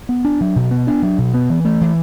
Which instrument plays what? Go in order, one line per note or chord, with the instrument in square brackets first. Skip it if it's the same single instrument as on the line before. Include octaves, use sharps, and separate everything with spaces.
[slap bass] B3
D4
F#3
B2
B3
D4
F#3
B2
B3
E3
A3
E3